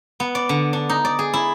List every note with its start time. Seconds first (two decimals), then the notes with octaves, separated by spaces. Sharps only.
0.20 B3
0.35 D5
0.49 D3
0.73 D4
0.89 D#4
1.05 D5
1.19 G#4
1.34 E4